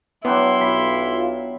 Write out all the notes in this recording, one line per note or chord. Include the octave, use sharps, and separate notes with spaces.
F#3 B3 D4 E4 G5 C6
B1 F4 B5